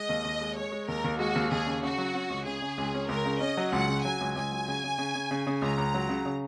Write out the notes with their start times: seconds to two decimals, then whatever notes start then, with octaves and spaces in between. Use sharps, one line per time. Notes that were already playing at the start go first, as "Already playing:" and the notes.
Already playing: G#3 D#5
0.09 D#2
0.24 D#2
0.41 G#3
0.56 G#3 C#5
0.72 G#3
0.88 D#2 A#4
1.04 D#2
1.19 G#3 F#4
1.35 D#2
1.51 D#2 G#4
1.67 C#3
1.83 C#3 F#4
1.98 F#3
2.15 C#4
2.30 C#2
2.46 C#3 G#4
2.62 C#3
2.78 C#2
2.94 C#4
3.09 C#2 A#4
3.26 C#3
3.40 C#4 D#5
3.57 F#3
3.72 C#2 F#5
3.88 C#3
4.04 F#3 G#5
4.21 C#2
4.36 C#2 G#5
4.52 F#3
4.68 C#3
4.84 C#3
4.98 C#3
5.15 C#3
5.31 C#3
5.47 C#3
5.62 C#2 A#5
5.78 C#2
5.94 F#3
6.09 C#3
6.26 C#3